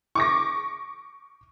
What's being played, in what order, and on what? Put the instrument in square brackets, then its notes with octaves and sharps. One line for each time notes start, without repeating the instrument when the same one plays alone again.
[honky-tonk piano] C#6 D6 A#6